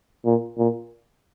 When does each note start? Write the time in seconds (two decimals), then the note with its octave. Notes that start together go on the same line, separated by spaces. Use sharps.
0.25 A#2
0.58 A#2